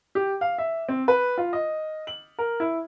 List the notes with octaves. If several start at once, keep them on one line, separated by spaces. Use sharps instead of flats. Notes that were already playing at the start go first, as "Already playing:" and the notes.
G4
F5
E5
C4
B4
F4
D#5
F#7
A#4
E4